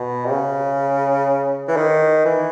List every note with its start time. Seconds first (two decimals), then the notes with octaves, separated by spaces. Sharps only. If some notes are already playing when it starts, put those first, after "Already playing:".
Already playing: B2
0.25 C3
0.31 C#3
1.68 E3
1.76 D#3
2.25 E3